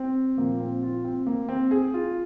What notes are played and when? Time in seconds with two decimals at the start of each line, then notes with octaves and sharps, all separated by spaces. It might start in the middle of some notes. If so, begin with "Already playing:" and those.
Already playing: C4
0.38 A#2 F3 A#3
0.60 C4
0.83 F4
1.04 C4
1.27 A#3
1.49 C4
1.71 G#4
1.94 F4